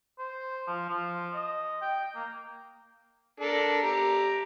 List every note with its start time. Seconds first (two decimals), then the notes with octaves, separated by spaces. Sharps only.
0.19 C5
0.67 F3
0.89 F3
1.34 D#5
1.82 G5
2.16 A#3
3.40 D4 A4 A#4
3.82 G4 A#5